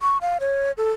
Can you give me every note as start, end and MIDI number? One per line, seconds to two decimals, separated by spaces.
0.02 0.18 85
0.21 0.38 77
0.40 0.72 73
0.77 0.90 69